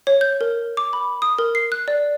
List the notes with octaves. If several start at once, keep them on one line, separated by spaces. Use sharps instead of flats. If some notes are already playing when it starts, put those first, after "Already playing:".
C#5
G6
A#4
D6
B5
D#6
A#4
C7
F#6
D5